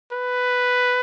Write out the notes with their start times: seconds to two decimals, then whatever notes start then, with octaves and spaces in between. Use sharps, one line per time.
0.12 B4